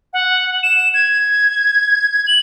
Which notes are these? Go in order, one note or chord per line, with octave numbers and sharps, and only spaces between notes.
F#5
E7
G#6
F#7